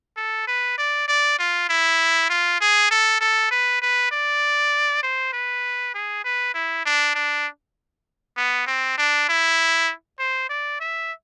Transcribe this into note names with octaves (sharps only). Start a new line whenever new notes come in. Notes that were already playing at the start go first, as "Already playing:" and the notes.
A4
B4
D5
D5
F4
E4
F4
G#4
A4
A4
B4
B4
D5
C5
B4
G#4
B4
E4
D4
D4
B3
C4
D4
E4
C5
D5
E5